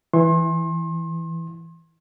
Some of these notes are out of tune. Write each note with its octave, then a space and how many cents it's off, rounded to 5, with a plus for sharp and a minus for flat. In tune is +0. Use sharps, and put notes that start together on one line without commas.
E3 +0 C6 +35